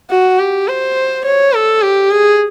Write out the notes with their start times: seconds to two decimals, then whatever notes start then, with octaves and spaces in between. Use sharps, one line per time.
0.10 F#4
0.39 G4
0.68 C5
1.25 C#5
1.53 A4
1.82 G4
2.10 G#4